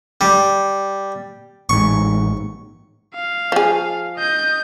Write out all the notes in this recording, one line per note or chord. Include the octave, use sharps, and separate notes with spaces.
G3
A1 G#2 C#6
F5
F3 G#4
D#5 G6